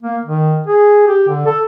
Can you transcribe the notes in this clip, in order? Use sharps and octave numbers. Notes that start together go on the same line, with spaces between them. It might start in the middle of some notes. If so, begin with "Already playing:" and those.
A#3
D#3
G#4
G4
D3
A4